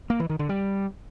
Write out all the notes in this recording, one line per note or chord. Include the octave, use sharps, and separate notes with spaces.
A#3
E3
D#3
D3
G3